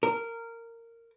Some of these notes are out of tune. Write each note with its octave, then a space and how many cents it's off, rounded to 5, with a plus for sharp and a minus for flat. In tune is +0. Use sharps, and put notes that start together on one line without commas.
A#4 -15